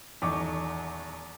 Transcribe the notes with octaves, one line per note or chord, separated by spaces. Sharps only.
D#1 E2 D#4 C#6 D6